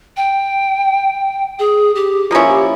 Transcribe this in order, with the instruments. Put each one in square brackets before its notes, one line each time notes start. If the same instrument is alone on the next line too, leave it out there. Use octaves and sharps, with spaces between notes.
[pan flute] G5
G#4
G4
[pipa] F3 A#3 C#4 E4 [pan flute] F4
[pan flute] G4